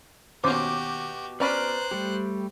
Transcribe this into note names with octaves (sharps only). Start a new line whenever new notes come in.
D#2 B2 C#4 F#4 G4 C5 D6
C#4 B4 C5 D5 A#5 B5 F6 F#6
G3 A3 G4